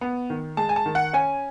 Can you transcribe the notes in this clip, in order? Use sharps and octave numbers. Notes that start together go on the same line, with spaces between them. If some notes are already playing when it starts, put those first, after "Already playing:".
B3
D#3
G#3 A5
G#5
A5
D#3
F#5
C#4 G#5